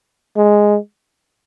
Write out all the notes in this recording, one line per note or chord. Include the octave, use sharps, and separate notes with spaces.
G#3